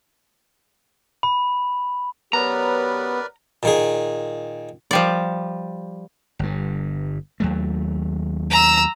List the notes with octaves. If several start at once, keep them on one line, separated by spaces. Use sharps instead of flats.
B5
F#2 B3 G4 A#4 B4 C#5 D5 A#5
A#2 D#3 G#4
F3 G3 D5
G1 G2
D#2 F#3 A3
A#5 E6